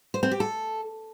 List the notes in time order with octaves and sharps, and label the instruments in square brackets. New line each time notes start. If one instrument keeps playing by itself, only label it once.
[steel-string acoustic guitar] C5
C4
G4
A4